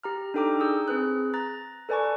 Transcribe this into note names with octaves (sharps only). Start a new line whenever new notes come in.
G4 A#5 F6
D4 D#4 A4 G5 A#5 D6
G#4 D#6 E6 G6
C4 G#4 B4 F#6
A#5 F#6 A6
A4 B4 D5 G#5 A5 C#6